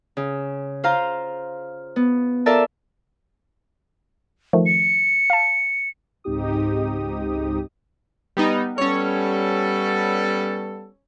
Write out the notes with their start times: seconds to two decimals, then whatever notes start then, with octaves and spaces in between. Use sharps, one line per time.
0.17 C#3
0.84 F4 C5 F5 A#5
1.96 B3
2.46 F4 A4 A#4 D5 E5 A5
4.53 D#3 F3 A3
4.66 C#7
5.30 F5 A5
6.24 C#2 G#2 C4 D#4 G4 D#6
8.37 G3 B3 D#4
8.78 G3 B3 C#4 A4 C#5